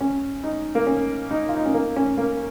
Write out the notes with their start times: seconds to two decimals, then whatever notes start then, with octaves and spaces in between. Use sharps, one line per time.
0.01 C#4
0.43 D#4
0.75 A#3
0.87 C#4
1.31 D#4
1.49 F4
1.56 D#4
1.66 C#4
1.74 A#3
1.96 C#4
2.18 A#3